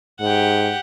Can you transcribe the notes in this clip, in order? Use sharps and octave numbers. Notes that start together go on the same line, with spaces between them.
G#2 G4 F#5